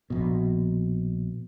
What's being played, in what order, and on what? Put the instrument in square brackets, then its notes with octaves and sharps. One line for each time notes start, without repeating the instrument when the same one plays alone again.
[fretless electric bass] A#1 B2